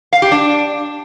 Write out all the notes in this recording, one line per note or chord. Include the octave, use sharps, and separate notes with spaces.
F5
G4
D4